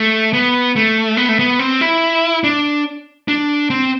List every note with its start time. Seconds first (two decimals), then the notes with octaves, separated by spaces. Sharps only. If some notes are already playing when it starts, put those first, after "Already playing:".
Already playing: A3
0.33 B3
0.76 A3
1.17 B3
1.29 A3
1.39 B3
1.59 C4
1.81 E4
2.44 D4
3.28 D4
3.70 C4